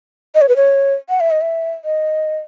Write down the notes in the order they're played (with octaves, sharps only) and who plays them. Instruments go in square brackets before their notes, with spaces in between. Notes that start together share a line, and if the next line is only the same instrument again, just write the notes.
[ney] D#5
C#5
B4
C#5
F#5
E5
D#5
E5
D#5